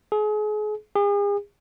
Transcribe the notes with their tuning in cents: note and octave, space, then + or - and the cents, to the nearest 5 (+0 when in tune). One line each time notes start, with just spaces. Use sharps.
G#4 +35
G#4 -40